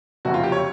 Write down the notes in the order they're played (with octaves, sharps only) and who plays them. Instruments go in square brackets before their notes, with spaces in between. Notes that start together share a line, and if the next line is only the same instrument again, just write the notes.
[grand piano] F#1 F2 C3 F#4
F4
G4
C#5